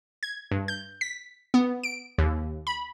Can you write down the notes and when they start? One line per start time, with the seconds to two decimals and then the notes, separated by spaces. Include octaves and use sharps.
0.23 G#6
0.52 G2
0.68 G6
1.01 B6
1.54 B3
1.83 D7
2.18 D#2
2.67 B5